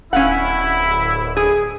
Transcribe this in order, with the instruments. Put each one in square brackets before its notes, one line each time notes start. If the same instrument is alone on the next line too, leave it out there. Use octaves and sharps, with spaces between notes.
[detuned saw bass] D1 [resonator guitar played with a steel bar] C#4 F5 F#5 [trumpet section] E4
[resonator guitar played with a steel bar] G#4